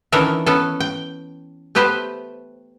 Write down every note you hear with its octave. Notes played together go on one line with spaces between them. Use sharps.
D#3 E3 C#4 D4 A4 A#4
B3 C#4 A4
G5
A3 B3 G4 B4 C5